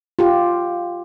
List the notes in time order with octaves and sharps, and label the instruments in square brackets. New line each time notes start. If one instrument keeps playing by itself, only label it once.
[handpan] F4 G4